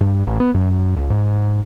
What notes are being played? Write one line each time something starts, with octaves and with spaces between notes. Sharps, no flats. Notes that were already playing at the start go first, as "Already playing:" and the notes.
G2
A1
B3
F#2
C#2
G#2